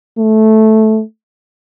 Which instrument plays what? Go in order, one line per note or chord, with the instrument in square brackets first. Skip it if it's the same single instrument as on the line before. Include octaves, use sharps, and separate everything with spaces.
[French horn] A3